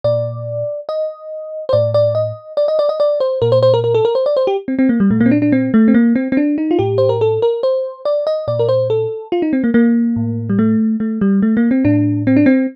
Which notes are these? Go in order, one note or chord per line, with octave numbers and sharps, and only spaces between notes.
A#2 D5
D#5
C5
A2 D5
D5
D#5
D5
D#5
D5
D#5
D5
C5
A#2 A#4
C5
C5
A#4
A#4
A4
A#4
C5
D5
C5
G4
C4
C4
A#3
G3
A#2 A3
A#3
C4
D4
D4
C4
A3
C4
A#3
C4
C4
D4
D#4
F4
A2 G4
C5
A#4
A4
A#4
C5
D5
D#5
A#2 D5
A#4
C5
A4
F4
D#4
C4
A#3
A#3
A2
G3
A3
A3
G3
A3
A#3
C4
A2 D4
C4
D4
C4